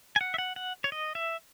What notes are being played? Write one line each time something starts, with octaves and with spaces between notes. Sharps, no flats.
G#5
F#5
E5
F#5
F#5
C#5
D#5
E5